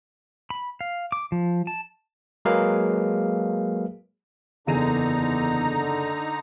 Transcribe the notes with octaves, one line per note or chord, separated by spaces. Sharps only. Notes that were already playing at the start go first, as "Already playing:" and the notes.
B5
F5
D6
F3
A5
F#3 G#3 A#3 G#4 B4 F5
F#1 E2 D3 D#4 G#4 A#5 D#7